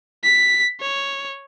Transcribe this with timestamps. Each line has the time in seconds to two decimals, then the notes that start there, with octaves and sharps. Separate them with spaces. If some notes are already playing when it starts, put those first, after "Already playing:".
0.24 B6
0.80 C#5